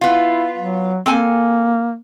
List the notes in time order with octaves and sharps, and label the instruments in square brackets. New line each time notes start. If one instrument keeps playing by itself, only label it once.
[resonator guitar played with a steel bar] B3 F4 [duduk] E4
[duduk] F#3
[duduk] A#3 [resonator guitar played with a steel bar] C4 A4 G#5